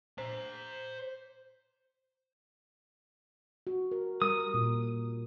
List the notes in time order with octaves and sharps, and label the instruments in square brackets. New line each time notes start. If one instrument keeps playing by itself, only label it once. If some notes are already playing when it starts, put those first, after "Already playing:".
[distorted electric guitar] C5 A#5
[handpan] F#4
A#4
[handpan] G3 A#4 [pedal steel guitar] D#6
[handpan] A#2